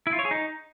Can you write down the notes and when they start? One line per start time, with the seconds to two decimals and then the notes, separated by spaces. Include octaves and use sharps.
0.07 E4
0.13 F4
0.19 C#5
0.25 G#4
0.31 D#4